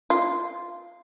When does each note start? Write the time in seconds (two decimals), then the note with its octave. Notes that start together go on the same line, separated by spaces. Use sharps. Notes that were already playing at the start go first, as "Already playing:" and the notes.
0.10 F4